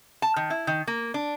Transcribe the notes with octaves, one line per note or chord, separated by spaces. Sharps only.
A5
D#3
E4
D#3
A#3
D4